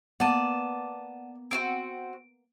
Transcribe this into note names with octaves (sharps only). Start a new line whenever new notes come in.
A#3 B3 D5 F#5 A5 D#7 E7
C4 F4 F#4 D7